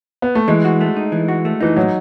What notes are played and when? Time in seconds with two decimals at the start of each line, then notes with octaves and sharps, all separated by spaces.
0.22 B3
0.35 A3
0.48 E3 G#3
0.65 F#4
0.81 A3
0.96 D#4
1.12 E3
1.28 F#4
1.45 A3
1.60 E3 D#4
1.76 A2 F#3